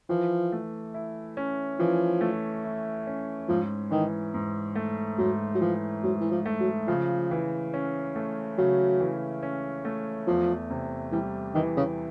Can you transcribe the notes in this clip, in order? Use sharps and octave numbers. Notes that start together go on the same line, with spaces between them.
E3 F3
A3
E4
C#4
E3 F3
A3
E4
C#4
G#2 F3
D#3 E3
G#2
A3
G#2 F#3
F#3
E3 F3
G#2 F#3
E3
F3
A3
F#3
C#3 F3
E3
C#4
A3
C#3 F#3
E3
C#4
A3
E2 F3
C3
E3 G3
D#3 E3
C#3